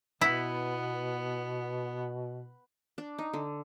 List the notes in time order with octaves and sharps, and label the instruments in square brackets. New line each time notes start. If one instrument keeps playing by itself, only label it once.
[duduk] B2 [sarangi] B3 [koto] E4
[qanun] D4
D#4
D3